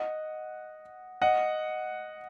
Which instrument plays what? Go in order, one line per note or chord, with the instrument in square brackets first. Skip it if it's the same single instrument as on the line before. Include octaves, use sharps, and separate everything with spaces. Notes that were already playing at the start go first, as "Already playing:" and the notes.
Already playing: [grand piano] D#5 F#5
D#5 F#5